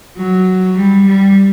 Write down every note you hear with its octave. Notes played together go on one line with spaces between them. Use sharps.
F#3
G3
G3